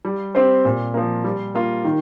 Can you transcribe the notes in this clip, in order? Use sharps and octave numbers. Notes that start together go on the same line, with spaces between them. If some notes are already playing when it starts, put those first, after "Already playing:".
G3
C4 G4 C5
A#2
F3 A#3
G3
A#3 F4
D#3